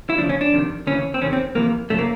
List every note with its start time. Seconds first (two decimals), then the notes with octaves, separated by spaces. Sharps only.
0.10 E4
0.18 D2 C#3 F3 D4
0.29 C#4
0.41 D4
0.52 F2 C3 D#3
0.87 D2 C#3 E3 C#4
1.14 C4
1.21 E2 C3 D#3 C#4
1.33 C4
1.55 F2 C3 E3 A#3
1.90 F#2 C#3 F3 A3
1.99 A#3